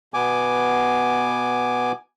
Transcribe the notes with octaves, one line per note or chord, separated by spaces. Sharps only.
B2 B3 G#5 D6